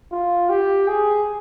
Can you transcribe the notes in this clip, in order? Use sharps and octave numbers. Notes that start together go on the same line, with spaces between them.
F4
G4
G#4